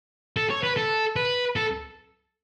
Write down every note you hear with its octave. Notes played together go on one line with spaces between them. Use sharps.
A4
C#5
B4
A4
B4
A4